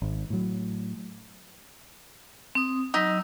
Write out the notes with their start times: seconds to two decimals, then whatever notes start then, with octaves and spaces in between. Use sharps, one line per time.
0.02 G#1
0.30 A2 F#3
2.55 C4 D#6
2.94 F#3 D#4 E6